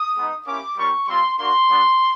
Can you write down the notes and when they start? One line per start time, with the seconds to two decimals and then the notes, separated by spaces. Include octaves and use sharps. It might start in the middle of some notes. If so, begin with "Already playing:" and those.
Already playing: D#6
0.16 G#3 B3 D#4
0.47 A#3 C#4 E4 G4 D6
0.77 G3 A#3 C#4 F4 C#6
1.08 G3 C4 F4 C6
1.39 A#3 D4 F#4 C6
1.70 G3 B3 D4